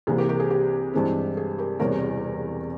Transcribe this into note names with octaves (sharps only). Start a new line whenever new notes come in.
C2 C3 E3 A#3 G#4
G4 A#4
G4 A#4
G#4
G4
G2 E3 G#3 C4
G#4
G4 A#4
E1 E2 C3 G3 A#4 C#5